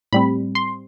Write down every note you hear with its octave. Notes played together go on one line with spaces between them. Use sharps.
A2 G3 C4 B5
C6